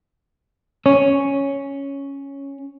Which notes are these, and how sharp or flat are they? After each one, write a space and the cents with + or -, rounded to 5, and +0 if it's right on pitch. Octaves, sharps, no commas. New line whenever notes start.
C#4 +0 C#5 +0